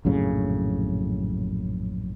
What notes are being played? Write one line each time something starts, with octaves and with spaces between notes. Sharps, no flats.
A#1 F#2 A2 C#3